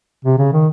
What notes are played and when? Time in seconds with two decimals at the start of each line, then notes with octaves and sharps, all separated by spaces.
0.25 C3
0.38 C#3
0.53 D#3